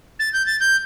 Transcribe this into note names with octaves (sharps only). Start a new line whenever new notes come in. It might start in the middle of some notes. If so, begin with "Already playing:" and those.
A6
G6
A6
G6